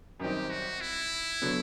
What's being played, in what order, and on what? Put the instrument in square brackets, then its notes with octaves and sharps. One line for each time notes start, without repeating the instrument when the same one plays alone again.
[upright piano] F#2 D#3 G3 C4 D#4 [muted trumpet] G4
[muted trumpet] F#4
E4
[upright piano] D3 F#3 B3